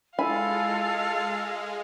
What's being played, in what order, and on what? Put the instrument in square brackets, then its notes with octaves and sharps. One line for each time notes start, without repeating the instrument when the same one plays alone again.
[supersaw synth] G#3 [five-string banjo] E4 G#5 B5 [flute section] F4 A4 [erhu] F5